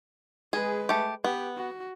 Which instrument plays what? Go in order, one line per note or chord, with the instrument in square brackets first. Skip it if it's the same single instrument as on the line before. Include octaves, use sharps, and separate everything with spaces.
[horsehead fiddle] G#3 B4 [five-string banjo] G#4
[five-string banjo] A3 G4
[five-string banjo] B3 [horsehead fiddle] G4
[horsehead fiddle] F#4